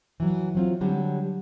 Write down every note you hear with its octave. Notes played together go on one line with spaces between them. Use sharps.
E3 F#3
F#3 C4 F4
D3 F#3 G3 G4